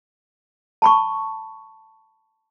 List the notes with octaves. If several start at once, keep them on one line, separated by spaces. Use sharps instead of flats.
A5 B5 C#6